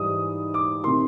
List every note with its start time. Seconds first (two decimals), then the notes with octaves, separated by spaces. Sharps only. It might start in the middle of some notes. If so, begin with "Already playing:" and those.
Already playing: G#2 E3 G3 D#6
0.54 D6
0.84 C3 D#3 C6